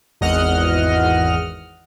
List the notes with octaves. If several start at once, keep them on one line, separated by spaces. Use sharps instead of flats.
G#1 E2 D#5 F#5 F6